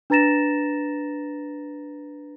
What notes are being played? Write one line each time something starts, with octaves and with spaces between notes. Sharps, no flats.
D4 B4 A#5 A6 A#6 E7